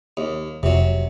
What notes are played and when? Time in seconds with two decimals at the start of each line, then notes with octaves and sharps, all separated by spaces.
0.17 D#2
0.63 F1 C3 F#3